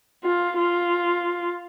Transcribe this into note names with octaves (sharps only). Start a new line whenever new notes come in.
F4
F4